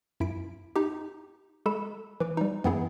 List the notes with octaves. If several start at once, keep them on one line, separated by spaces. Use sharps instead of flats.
F#2 E4 B6 D7
D#4 G4
G#3 A4 B5 E7
E3 B4 D6
G3 D#4
F#2 E3 B3 C4 E4 G#4